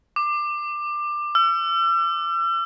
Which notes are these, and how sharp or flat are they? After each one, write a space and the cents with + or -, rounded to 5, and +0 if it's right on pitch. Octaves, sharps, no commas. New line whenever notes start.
D6 +20
E6 +45